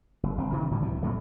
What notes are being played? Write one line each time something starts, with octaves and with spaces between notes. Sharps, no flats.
F#1
G1 C4
G2 C3 D#3 E3
G#2 D3 F3 G3
C#2 C3 E3 F#3
F2 A#2 F#3 A3